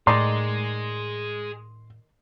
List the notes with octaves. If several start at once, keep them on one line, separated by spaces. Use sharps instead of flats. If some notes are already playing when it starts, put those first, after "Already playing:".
A2 D#3 D#4 G#4 D5 D#5 C6